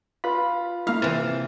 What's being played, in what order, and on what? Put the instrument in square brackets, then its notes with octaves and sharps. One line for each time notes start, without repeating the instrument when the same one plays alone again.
[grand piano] F4 [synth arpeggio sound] B4 B5
[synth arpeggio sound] A#3 E4 [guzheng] F5
[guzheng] C3 E3 [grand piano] A6